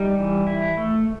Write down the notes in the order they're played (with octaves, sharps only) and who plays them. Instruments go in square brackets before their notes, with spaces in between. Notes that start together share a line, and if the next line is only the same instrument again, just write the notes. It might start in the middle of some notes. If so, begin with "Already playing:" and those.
Already playing: [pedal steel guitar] G3 D#4
E3
E4
A3